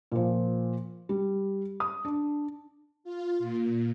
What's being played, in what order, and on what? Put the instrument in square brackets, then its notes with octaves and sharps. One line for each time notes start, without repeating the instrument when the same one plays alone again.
[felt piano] A#2 F3
G3
D#6
D4
[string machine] F4
A#2